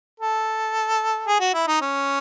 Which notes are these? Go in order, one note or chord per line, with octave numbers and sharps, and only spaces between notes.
A4
G#4
F#4
E4
D#4
C#4